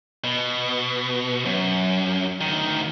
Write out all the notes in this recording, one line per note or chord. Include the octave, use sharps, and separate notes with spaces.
B2
F#2
D2 D#3